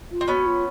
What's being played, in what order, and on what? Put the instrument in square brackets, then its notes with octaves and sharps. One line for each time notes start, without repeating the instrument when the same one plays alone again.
[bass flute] F4
[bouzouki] C4
[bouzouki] B3 C#4 [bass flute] F#4
[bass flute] F4